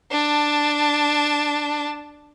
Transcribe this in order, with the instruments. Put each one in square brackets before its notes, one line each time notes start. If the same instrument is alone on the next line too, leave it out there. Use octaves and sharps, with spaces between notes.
[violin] D4 A5